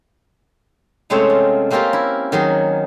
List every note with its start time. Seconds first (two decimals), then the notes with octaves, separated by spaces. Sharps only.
1.10 C3 G#3 A3 C4 C#4 C#5
1.30 F4
1.71 A#3 C4 C#4 F4 G4 A#4
1.93 E4
2.32 D#3 F#3 G#4